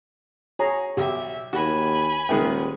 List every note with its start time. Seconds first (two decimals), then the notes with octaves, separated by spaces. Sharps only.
0.59 F#4 G#4 C#5 A#5
0.97 B1 G4 D5 E5
1.53 D#2 F#4 G#5 B5
2.29 D#1 D#3 G#3 B3 A#4 E5 G5